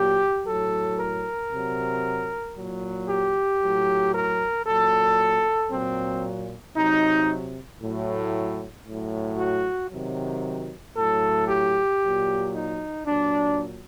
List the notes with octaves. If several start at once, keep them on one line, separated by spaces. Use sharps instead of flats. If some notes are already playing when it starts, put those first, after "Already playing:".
Already playing: A#2 F#3 G4
A2 F#3 A4
A#4
C3 F#3
A#2 F#3
G4
A2 F#3
A#4
A#2 F#3 A4
A#2 F#3 C4
C3 F#3 D#4
A2 F#3
A2 F#3
F#4
C3 D#3 F#3
A2 F#3 A4
G4
A#2 F#3
D#4
A#2 F#3 D4